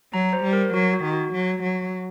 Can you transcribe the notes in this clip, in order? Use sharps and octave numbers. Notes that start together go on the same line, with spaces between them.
F#3 A#5
C5
G3
A#4
F#3 F#4
F#4
D#3
F#4
F#3
F#3